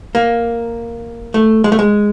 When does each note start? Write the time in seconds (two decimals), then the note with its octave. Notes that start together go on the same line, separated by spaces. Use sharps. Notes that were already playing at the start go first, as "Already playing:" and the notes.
0.15 A#3
1.34 A3
1.64 G#3
1.72 A3
1.79 G#3